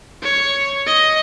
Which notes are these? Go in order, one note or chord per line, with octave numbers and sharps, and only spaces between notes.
C#5
D#5